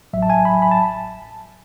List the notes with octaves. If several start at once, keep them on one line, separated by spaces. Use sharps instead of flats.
A1 A2 F#3 E5
A5
G#5
B5
B5
A5